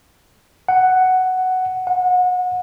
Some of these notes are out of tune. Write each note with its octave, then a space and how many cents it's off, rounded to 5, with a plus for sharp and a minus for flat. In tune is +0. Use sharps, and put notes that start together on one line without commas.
F#5 +5
F#5 -30